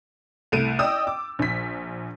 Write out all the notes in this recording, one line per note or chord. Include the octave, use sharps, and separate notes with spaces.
C2 A3 D7 D#7
D5 D#5 G5 D#6 E6
D6
A#1 B6